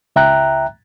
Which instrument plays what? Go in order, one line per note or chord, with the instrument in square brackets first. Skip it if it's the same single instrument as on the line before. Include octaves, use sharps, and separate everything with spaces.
[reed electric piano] C#2 E5 G5 A#5 F#6